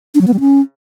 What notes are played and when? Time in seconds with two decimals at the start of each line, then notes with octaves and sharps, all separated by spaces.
0.15 D4
0.21 F#3
0.27 B3
0.34 G3
0.40 C#4